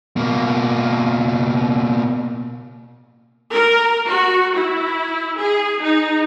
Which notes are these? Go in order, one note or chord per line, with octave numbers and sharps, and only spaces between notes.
B2 A#3
A#4
F#4
E4
G#4
D#4